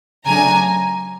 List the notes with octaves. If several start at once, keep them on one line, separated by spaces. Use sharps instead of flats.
C#3 F#3 A3 D4 G#5 A#5